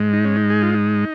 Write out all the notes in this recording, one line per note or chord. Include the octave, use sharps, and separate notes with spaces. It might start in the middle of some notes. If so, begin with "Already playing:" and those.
Already playing: G#2 G#3
D#4
C#4
D#4
G#4
F4
D#4